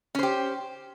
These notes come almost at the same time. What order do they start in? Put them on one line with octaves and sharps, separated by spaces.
C#4 C5 G4